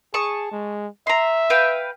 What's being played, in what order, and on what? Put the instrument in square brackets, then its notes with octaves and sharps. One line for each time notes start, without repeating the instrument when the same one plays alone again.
[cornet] G#4 [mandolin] A5 C#6 D#6
[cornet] G#3
[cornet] E5 [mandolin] A#5 C6
[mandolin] B4 F5 G5